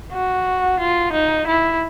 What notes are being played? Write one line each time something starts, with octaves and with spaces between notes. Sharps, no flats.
F#4
F4
D#4
E4